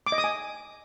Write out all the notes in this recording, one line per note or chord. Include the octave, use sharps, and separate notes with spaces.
D6
D#5
D#6
G#5